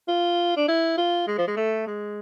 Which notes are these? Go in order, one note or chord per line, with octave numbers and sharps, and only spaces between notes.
F4
D4
E4
F4
G#3
F3
G#3
A3
G#3